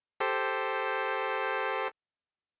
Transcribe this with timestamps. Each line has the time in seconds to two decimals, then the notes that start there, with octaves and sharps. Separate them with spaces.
0.20 G4 A4 C5